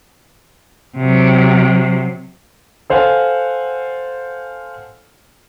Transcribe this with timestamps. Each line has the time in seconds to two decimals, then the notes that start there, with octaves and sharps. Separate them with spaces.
0.97 C3 F#3
2.90 A4 C5 F5 F#5 G#5